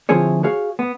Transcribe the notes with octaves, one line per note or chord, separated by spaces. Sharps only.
D3 F3 C4 E4 G#4 C#5
F#4 G#4 C#5 F5
B3